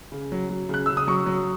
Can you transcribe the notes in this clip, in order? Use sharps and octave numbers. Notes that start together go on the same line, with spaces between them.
C#3
F#3
F#3
C#3 F#6
C#3 E6
D#6
F#3 C#6
F#3